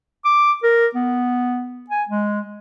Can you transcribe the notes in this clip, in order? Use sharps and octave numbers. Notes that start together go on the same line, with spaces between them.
D6
A#4
B3
G#5
G#3